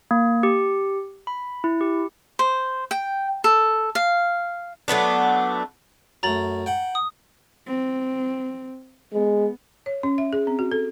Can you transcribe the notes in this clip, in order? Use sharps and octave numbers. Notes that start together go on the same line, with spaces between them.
A#3
G4
B5
E4
G4
C5
G5
A4
F5
F#3 A3 B3 D4
F#2 A3 A#5 A6 F#7
F#5 G5
D#6
C4
G#3 B3
C#5
C#4
E5
G#4
C4
F#4
A4